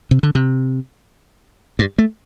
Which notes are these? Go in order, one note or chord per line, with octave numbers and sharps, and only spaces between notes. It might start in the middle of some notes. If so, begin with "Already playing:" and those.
C3
D3
C3
G2
A3